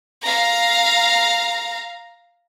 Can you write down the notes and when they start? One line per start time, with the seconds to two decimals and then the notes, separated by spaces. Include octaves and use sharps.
0.22 F5 A#5